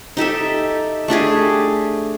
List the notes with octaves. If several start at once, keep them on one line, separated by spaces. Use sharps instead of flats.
D#4 G4 A4 E5
A3 D4 G4 G#4